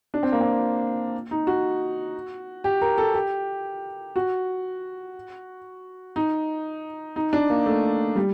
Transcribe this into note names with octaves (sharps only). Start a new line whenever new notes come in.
D4
C4
A#3
C4
D#4
F#4
G4
A#4
A4
G4
F#4
D#4
D#4
D4
A#3
A3
G3